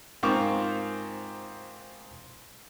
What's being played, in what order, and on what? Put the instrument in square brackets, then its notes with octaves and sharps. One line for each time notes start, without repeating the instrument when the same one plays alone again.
[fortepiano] G#2 C4 F4 A#4 C#6 D6